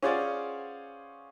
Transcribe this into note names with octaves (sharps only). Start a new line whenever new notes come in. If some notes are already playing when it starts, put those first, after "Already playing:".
C#4 F4 G#4 C5 D5 F#5